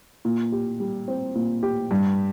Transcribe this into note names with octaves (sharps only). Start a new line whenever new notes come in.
A#2
G4
G3
C4
A#2
G4
G2